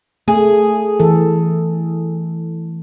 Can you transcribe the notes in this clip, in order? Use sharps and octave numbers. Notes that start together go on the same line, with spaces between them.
A3 G#4
E3 A4